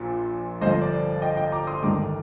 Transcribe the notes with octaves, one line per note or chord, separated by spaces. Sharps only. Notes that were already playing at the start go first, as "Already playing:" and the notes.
Already playing: A#1 A#2
G1 G2 F3 C5 D#5
D5
D#5 G5
D#5 G5
A#5 D6
C6 D#6
G1 G2 D#3 A#5 D6